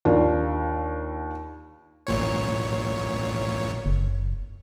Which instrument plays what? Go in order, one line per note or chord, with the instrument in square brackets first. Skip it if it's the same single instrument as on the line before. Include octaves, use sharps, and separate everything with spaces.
[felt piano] D#2 D#3 D4 F4
[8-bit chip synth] A1 A#2 C#5
[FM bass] F#1